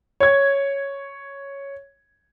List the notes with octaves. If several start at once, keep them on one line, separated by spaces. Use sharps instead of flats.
C#5 G#6